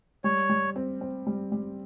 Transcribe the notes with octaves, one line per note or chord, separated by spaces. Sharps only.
G3 C#5
G3
C4
C4
G3
G3